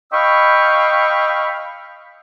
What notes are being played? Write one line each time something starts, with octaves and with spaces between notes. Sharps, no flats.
D#5 F5 G5 B5 C#6 E6